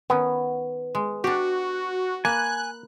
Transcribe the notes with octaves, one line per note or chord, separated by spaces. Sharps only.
D#3 B3 C#4
G#3
D4 F#4 G4
A#3 B4 G#5 F#6